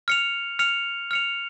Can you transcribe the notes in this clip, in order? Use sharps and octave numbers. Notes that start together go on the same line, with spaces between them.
F6 C#7 F7
F6 C#7 F7
F6 C#7 F7